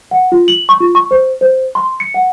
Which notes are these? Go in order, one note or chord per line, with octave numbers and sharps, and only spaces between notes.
F#5
F4
F#7
C#6
F4
C#6
C5
C5
C6
C#7
F#5